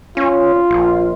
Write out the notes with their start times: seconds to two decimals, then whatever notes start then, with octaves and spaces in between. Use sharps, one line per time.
0.17 C#4 F4
0.70 A#1